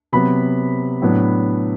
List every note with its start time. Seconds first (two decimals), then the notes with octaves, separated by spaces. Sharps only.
0.12 C3 F#3 B3 B5
1.02 A2 F#3 B3 D4